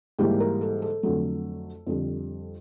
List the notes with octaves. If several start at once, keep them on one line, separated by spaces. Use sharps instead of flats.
G#2 E3 G3 A#3 G4
A#4
A4
A4
F2 D3 F#3 A3
F2 D3 G3